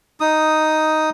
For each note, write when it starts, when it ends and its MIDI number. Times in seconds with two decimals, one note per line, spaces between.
0.21 1.10 63
0.21 1.10 87